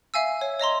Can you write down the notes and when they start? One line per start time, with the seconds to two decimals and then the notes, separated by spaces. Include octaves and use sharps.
0.14 E5 F5 G#5 E6
0.41 C#5
0.60 C#5 D#5 A#5 C6